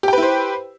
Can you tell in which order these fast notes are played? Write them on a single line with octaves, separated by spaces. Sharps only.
G4 G5 B4 E4 C5